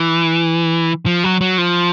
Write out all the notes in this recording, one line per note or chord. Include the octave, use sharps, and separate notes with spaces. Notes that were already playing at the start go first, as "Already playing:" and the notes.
Already playing: E3
F3
F#3
F#3
F3